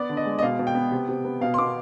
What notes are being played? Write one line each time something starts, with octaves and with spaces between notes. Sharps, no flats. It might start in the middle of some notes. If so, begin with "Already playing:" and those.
Already playing: B3 D5
D3
D#5
G#3
D#5
B2 F5
B2
G5
B3
C3
C3
B3
B2 F5
C6
B2 D6